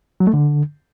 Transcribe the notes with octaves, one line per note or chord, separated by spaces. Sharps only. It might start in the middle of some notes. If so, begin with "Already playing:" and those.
F#3
A3
D3